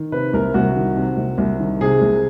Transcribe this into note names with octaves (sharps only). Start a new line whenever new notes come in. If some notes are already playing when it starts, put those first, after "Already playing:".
Already playing: D#3
C3 B4
C2 A#4
C2 F#4
D#3
C3
C2
C2
D#3
C3 G#4
C2